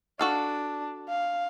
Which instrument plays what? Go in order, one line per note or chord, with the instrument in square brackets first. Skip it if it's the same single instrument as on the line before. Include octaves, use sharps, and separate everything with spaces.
[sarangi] D4 [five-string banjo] F#4 A4 F5
[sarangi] F5